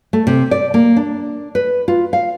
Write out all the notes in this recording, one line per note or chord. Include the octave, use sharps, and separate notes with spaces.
A3
C3
D5
A#3
D4
B4
F4
F5